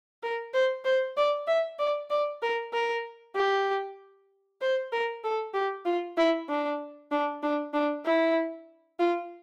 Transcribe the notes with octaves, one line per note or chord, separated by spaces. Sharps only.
A#4
C5
C5
D5
E5
D5
D5
A#4
A#4
G4
C5
A#4
A4
G4
F4
E4
D4
D4
D4
D4
E4
F4